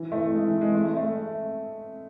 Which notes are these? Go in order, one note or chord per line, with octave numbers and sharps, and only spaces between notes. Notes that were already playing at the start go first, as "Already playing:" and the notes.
Already playing: E3
A3
G#3
E3
G#3
A3
A3
A3